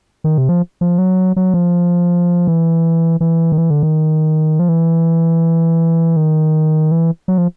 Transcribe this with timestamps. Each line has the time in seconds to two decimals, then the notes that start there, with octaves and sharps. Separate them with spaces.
0.24 D#3
0.38 C3
0.49 F3
0.81 F3
0.98 F#3
1.36 F#3
1.54 F3
2.47 E3
3.21 E3
3.52 D#3
3.57 E3
3.70 D3
3.83 D#3
4.59 F3
4.69 E3
6.16 D#3
6.91 E3
7.28 F#3
7.38 F3